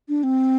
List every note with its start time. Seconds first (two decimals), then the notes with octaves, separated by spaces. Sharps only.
0.09 D4
0.23 C4